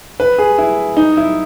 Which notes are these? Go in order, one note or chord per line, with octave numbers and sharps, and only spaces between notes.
B4
G#4
E4
D#4
E4